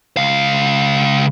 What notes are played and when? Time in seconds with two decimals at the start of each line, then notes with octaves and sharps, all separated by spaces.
0.17 C#2 F5